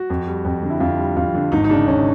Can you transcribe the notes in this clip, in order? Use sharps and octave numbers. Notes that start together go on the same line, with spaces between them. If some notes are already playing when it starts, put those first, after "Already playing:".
Already playing: F#4
F2
G3
F2
D3
E4
F2 F4
G3
F2 F4
D3
G#1 D#4
D#4
C#3 D4
G#1 C#4